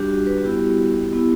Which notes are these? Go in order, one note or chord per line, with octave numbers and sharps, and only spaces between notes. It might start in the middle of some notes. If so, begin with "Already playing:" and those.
Already playing: G3 D4 F#4 G4
F#4
B4
F#4
G3 B3 E4 G4
B3 E4